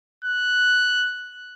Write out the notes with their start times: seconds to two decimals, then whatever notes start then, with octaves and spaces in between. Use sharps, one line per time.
0.24 F#6